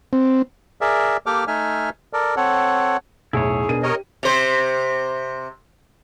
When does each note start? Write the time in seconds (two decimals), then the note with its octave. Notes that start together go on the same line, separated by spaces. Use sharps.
0.13 C4
0.81 G#4 A#4 D5 E5
1.26 A#3 G4 A4 D6 F6
1.48 A3 D#4 E5 G#5 F6
2.13 A4 A#4 D5
2.37 C4 A4 C#5 F#5
3.33 B1 E2 A2 E4 G#4 C#5
3.69 B2 D4 A#4 D#7
3.83 G4 A#4 C#5 D#5
4.23 C3 C5